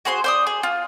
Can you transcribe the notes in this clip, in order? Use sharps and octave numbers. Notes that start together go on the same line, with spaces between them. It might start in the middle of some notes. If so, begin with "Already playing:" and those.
F#4 G#4 C5 C6
C5 D5 D#6
G#4
F4